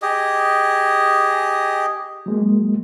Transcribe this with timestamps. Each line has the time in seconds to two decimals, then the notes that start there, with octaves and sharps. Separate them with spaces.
0.02 G4 G#4 D#5
2.26 F#3 G#3 A#3